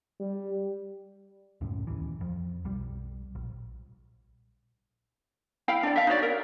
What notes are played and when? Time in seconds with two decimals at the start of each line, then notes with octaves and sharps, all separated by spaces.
0.20 G3
1.61 C#2 F#2 A2 C#4
1.87 A#1 D#2 E3
2.21 F2
2.65 B1 G3
3.35 A#1
5.68 E4 F5 G5
5.83 D4 D5
5.96 E5 F5
6.07 D#4 F#4 C#5 D5
6.22 A#4